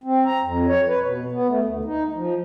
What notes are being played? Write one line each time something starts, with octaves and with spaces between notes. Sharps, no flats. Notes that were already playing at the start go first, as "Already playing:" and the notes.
C4
A#5
F2
C#5
B4
B2
B3
A3
D2
D#4
F3